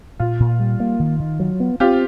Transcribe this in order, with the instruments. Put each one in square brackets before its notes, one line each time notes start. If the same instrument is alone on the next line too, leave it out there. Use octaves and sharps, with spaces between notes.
[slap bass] A#2 [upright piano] F4
[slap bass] A#2
G3
A#3
D#3
D#3
F#3
B3
[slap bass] C4 [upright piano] F4 G4